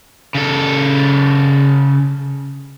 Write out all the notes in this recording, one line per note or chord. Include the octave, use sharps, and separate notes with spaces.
C#3 A4